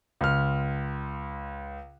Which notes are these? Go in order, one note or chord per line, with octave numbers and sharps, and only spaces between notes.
C#2 F6